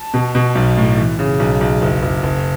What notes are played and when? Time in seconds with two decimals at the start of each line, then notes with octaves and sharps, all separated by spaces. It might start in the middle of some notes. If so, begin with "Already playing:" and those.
Already playing: A5
0.14 B2
0.35 B2
0.55 B1
0.77 A2
0.98 E3
1.19 C#3
1.40 B1
1.61 B1
1.82 F#1
2.02 F#1
2.23 F#1